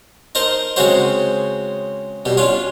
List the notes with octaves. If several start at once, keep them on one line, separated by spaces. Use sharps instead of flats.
D#4 A#4 C5 A5
C#3 G#3 C4 C#4 F#4 C5
B2 G3
C#4 D4 F4